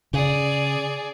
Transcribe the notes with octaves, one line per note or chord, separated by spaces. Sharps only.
C#3 G#4 D5